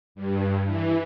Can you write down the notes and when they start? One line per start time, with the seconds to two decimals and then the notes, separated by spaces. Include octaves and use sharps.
0.15 G2
0.66 E3